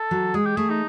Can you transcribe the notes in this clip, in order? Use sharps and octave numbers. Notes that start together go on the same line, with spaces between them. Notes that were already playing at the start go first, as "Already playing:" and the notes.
Already playing: A4
F#3
G#3 G#4
G4
A3 G#4
D#4